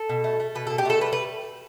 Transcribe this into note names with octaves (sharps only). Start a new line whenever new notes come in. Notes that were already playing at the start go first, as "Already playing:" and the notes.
Already playing: A4
B2
A3
A3
B2 B4
B2 A4
G4
A3 A4
G3 B4
B4